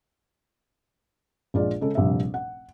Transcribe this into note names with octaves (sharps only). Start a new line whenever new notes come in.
A#1 G#3 F4 D5
C#3 G#3 A4
F1 A#1 G3 E5
F#5